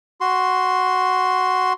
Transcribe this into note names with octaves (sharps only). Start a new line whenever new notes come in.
F#4 C6